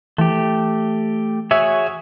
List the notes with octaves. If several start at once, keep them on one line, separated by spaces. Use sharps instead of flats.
E3 A3 G4
F#4 G#4 C#5 E5